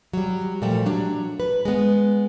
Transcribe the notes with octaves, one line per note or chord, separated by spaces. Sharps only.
F#3 G3
A#2 F3 G3 A3
F#3 D4
B4
G#3 B3